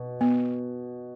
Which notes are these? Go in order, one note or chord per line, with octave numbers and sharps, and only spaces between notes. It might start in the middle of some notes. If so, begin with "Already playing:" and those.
Already playing: B2
B3